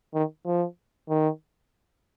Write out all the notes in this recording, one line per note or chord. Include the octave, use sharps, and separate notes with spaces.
D#3
F3
D#3